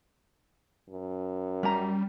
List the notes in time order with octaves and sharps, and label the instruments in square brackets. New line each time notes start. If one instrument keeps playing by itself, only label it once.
[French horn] F#2
[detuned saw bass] G3 [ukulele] C#4 A#5